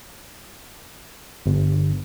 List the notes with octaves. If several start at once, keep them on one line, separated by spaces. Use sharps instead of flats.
G1